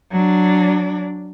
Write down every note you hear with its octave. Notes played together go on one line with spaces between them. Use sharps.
F#3 D4